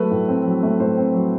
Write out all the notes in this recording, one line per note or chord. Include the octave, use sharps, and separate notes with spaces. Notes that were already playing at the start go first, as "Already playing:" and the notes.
Already playing: F#3 A3 B4
A2
C4
F#3
A3
A2 C5
C4
F#3